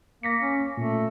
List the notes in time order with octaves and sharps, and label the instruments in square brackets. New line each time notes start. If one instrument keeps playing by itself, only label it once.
[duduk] A#3 [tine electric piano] A#6 B6 C#7
[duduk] C#4
[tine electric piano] A#2 [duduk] A3